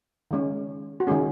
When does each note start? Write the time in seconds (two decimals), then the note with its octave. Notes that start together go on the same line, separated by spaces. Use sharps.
0.31 D#3 G#3 C#4
1.00 F#4
1.07 D#3 G#3 C#4 G#4